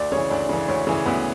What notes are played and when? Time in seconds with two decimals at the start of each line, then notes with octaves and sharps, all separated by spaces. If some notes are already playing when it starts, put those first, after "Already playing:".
Already playing: D2 D5
0.12 C#3 E3 C#5
0.30 D2 D4
0.49 C#3 E3
0.68 D2 C#4
0.87 C#3 E3
1.06 D2 B3